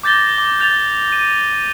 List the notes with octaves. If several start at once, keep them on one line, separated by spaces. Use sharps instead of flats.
D6 G6 A6 A#6 G7
D6
G6 A6 F7
D#7